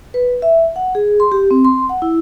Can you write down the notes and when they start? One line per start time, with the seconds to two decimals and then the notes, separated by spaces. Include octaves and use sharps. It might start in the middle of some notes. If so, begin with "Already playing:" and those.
0.14 B4
0.42 E5
0.76 F#5
0.95 G#4
1.20 C6
1.32 G4
1.51 C4
1.65 C6
1.90 F#5
2.02 E4